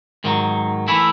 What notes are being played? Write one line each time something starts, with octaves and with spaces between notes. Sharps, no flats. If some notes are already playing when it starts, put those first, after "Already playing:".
G#2 D#3 F#3
E3 A3 E4